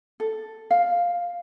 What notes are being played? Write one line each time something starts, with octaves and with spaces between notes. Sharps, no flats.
A4
F5